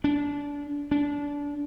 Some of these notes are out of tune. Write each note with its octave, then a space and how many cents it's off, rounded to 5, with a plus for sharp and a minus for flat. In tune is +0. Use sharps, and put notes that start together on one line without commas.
D4 -25
D4 -25